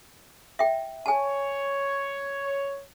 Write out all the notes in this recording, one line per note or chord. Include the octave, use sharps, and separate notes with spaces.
E5 G5
C#5 G#5 A5